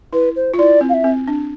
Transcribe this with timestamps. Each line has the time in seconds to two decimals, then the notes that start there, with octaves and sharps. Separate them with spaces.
0.13 E4 B4
0.36 C5
0.54 F4
0.58 E4 D5
0.81 C4
0.89 F5
0.94 E5
1.04 C4
1.28 D4